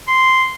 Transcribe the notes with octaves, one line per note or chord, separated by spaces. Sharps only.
C6